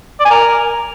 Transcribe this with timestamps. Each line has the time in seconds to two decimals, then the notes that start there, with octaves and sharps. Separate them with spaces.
0.20 D5
0.25 G#5
0.30 A#4